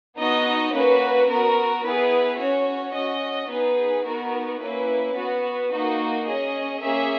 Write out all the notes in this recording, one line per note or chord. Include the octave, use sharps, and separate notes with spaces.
B3 D#4 F#4 D#5
A#3 C#4 F#4 B4
B3 F#4 A#4
B3 E4 G#4 B4
C#4 F#4 C#5
C#4 F#4 D#5
B3 D#4 G#4 B4
B3 D#4 F#4 A#4
A#3 C#4 E4 B4
B3 F#4
A#3 D#4 F#4
C#4 G#4 D#5
A#3 C#4 G#4 E5